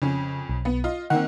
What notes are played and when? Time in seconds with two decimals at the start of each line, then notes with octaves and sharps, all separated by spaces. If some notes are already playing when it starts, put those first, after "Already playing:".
0.02 F2 C#3 C#4
0.49 B1
0.65 B3
0.84 F4 D#5
1.10 D#3 A#3 C4 F#5